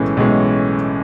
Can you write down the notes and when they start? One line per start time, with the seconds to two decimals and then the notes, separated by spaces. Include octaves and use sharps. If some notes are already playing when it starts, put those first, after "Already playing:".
Already playing: B1 A2 E3 G#3 C#4
0.17 B1 A2 E3 G#3 C#4